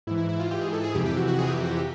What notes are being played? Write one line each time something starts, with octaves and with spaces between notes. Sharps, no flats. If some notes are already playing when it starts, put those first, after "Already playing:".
G#2 E3 E4
E4
E4
F4
G#2 E3 G4
G#4
A4
G#4
F2 C3 E3 G4
G4
F#4
F#4
F2 C3 E3 G#4
G4
F#4
G4